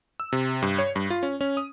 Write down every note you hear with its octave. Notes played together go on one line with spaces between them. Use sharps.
E6
C3
G2
C#5
G2
F4
C#4
C#4
D#6